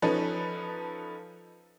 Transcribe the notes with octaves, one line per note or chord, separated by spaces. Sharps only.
F3 C#4 D#4 A4 B4